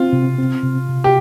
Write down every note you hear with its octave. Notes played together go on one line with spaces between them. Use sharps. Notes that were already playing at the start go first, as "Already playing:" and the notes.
Already playing: C4 F4
C3
C4
C3
C3
G4